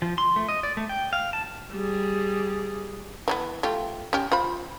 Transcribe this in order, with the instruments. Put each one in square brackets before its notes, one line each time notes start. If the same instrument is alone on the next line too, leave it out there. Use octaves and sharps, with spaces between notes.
[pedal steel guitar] F3
C6
A3
D#5
D5
A3
G5
F5
A5
[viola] G3 G#4
[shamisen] E3 F#3 B3
A3 F4 G4
C#4 G4
F4 C5 B5